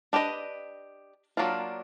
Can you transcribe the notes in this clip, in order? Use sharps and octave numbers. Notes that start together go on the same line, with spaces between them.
D4 G4 B4 D#5
F#3 A#3 D4 F4